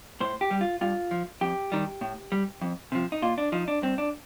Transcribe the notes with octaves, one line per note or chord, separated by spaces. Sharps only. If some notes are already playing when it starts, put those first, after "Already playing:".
A2 C5
G4
G3
F4
G2 F4
F3
F2 G4
D#3 G3
A2
G3
F2
C3 F3
D#4
A#2 F4
D4
F3 D#4
D4
G2 C4
D4